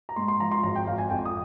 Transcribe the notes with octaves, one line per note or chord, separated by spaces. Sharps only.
A#5
G#2 C6
C6
F3 A#5
C6
G#1 A#5
G5
G#1 F5
G#5
F2 G5
D#6